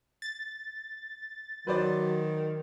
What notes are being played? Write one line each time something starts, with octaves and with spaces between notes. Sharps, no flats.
A6
D#3 F#3 B4 C5 D5